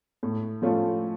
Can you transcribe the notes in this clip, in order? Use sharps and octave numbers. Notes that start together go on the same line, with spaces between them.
A2
F3 A3 C#4 F4